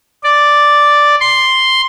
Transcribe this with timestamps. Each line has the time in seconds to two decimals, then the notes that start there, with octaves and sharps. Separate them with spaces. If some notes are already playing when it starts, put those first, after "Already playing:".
0.23 D5
1.20 C6